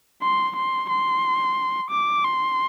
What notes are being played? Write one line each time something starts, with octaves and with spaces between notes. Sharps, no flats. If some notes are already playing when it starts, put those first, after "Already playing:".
C6
C6
C6
D6
C6